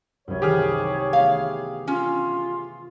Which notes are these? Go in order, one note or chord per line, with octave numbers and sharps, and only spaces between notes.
C2 F#2 C#5
D#3 E3 G4 G#4 F6
A3 B3 F5
C#4 F4